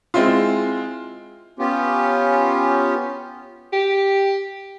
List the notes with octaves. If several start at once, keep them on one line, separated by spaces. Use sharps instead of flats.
G#3 C4 E4 F4
B3 C#4 F4 G4
G4